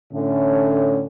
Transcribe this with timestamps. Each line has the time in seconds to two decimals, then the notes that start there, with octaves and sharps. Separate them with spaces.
0.14 A2 D3 C#4